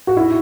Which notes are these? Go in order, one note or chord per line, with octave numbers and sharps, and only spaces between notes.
F#4
E4